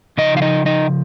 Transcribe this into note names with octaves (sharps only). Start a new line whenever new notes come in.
C#3 F3 D#4 D#5
F5
D#4 D#5
D#4 D#5